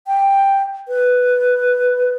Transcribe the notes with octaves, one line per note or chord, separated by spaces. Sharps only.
G5
B4